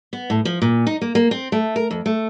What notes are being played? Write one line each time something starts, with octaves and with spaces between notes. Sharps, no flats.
B3
A2
F3
A#2
D#4
A#3
A#3
C4
A3
A#4
F2
A3